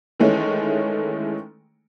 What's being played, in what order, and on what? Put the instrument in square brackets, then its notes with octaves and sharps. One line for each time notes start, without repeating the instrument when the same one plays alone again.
[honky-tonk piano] D#3 E3 G#3 A3 C#4